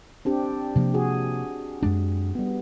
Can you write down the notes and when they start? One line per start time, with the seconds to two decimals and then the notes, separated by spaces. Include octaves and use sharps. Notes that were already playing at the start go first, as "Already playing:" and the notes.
0.25 C4 D4 G4
0.76 C3 F3 A#3
0.94 F#4 G#4
1.83 F#2 G#3 D4
2.35 G3 B3